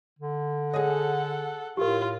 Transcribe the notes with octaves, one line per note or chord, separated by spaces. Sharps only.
D3
G#4 A4 C#5 D#5 F#5
A2 F4 G4 A#4